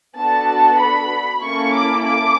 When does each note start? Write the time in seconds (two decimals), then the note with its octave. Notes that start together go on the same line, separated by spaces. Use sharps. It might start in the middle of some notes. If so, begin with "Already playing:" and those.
0.16 B3 D4 F#4 A4 A5
0.80 B5
1.42 A#3 C#4 E4 A4 C#6
1.74 D6
2.06 D6